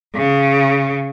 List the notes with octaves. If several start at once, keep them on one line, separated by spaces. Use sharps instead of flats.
C#3